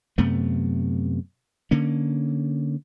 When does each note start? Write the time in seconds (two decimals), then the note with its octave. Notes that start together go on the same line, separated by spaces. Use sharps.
0.18 F#2 C3 A3 B3
1.71 D3 A#3 C#4